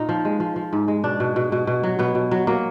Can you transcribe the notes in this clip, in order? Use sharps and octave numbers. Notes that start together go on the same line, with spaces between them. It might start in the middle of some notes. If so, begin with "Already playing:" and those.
Already playing: A#2 D#4
F3
G#3
F3
F3
G#2
G#3
B2 D4
B2
B2
B2
B2
F#3
B2 B3
B2
F#3
F#3 A#3